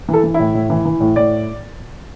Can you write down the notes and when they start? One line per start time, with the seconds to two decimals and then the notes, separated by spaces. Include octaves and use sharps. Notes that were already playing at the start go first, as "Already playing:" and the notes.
0.08 E3 A4
0.24 E3
0.34 E4
0.40 A2
0.55 A2
0.70 E3
0.85 E3
1.00 A2
1.16 A2 D5